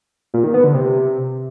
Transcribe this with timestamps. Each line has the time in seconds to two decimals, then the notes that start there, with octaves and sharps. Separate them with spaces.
0.34 A#2
0.44 D#3
0.54 B3
0.64 D3
0.74 C3